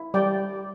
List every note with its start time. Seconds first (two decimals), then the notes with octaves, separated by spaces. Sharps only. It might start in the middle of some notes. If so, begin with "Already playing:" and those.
Already playing: E4
0.14 G3 D5 G5